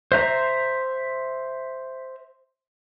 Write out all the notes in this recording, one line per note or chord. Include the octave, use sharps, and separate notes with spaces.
C5 E5 A#5